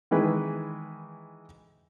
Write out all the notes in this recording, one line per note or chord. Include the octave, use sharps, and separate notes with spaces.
D#3 E3 G#3 B4